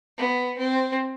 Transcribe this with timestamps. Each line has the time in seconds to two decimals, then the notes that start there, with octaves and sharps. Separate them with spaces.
0.18 B3
0.58 C4